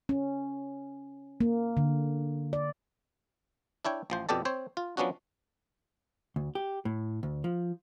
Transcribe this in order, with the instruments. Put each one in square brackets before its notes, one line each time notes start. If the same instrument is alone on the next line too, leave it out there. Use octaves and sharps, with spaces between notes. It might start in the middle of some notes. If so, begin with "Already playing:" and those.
[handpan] C#4
A#3
D3
D5
[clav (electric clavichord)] D4 E4 C#5 G5
A1 F3 C5
F2 B2 G4 A4 D5 A5
C4 C5 C#5
F4
F3 F#3 B3 C#4 D4 F#4
[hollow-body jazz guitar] D2
G4
A2
D2
F3